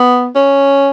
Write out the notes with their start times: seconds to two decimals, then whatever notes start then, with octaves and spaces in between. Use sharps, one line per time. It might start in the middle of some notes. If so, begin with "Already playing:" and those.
Already playing: B3
0.35 C#4